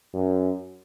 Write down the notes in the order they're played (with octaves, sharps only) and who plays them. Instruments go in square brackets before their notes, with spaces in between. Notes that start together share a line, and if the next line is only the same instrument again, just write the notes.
[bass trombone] F#2